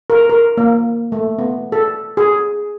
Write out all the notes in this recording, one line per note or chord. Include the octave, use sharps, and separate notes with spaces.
A#4
A#4
A#3
A3
B3
A4
G#4